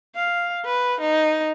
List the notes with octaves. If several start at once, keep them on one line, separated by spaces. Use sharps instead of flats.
F5
B4
D#4